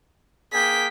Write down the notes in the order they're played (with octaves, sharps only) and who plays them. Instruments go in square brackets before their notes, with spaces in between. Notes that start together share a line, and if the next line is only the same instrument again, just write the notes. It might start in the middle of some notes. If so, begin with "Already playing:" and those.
[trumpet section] A#3 G#4 G5 [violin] B6